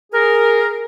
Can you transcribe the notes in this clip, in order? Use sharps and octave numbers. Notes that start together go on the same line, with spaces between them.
G#4 A#4